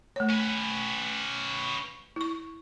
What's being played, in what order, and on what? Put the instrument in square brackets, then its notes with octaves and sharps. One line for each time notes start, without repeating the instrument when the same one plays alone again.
[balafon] A3 C#5
[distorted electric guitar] C#4 B4
[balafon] E4 C#6